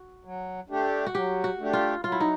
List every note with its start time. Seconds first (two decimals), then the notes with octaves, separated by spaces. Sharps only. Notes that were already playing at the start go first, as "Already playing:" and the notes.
Already playing: F#4
0.24 F#3
0.69 A3 D4 G4
1.06 F#4
1.14 F#3 G4
1.44 F#4
1.59 A3 D4 G4
1.73 F4
2.04 F#3 F4
2.12 E4
2.20 D#4